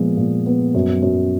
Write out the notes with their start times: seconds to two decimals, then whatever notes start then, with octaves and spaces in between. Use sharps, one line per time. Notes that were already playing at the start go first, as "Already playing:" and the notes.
Already playing: A#2 F3 G#3 B3
0.17 A#2
0.46 B3
0.75 F#2
1.02 F#2